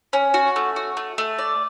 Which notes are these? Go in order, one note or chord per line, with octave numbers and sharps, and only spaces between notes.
C#4
F#4
A3
F#4
A3
A3
D5